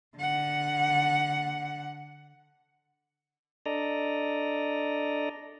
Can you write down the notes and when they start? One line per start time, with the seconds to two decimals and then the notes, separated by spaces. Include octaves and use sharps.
0.17 D3 F#5
3.66 D4 A4 D5 D#5 A#5